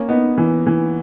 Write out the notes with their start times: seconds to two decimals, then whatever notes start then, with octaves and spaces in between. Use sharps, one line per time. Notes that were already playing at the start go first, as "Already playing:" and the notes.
Already playing: A#3 C#4
0.09 B3 D#4
0.38 E3
0.67 E3